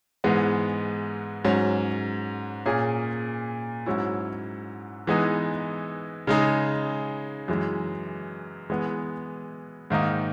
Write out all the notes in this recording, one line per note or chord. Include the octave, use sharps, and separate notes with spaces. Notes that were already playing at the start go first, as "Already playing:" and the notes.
G#2 E3 G#3 B3
G#2 F#3 C#4
A#2 A#3 C#4 G#4
G#2 F#3 C#4 E4
E3 G#3 B3 D#4
C#3 G#3 D#4 G#4
F#2 E3 G#3
E3 G#3 B3
G#2 D#3 A#3 D#4